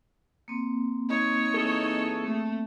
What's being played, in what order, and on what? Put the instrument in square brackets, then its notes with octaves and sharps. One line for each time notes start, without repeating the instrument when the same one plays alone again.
[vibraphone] A#3 C4
[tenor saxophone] D#4 [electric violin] C#5
[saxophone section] E3 G#4 A4
[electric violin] A3